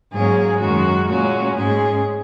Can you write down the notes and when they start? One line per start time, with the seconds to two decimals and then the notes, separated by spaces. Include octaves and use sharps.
0.12 G#2 F#3 A#3 C#4 G#4
0.60 F#2 D#3 G#3 C#4 F#4
1.07 A#2 G#3 C#4 F#4
1.55 G#2 G#3 C#4 G#4